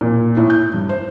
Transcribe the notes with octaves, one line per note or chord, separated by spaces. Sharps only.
A#2
A2
G6
G2
C5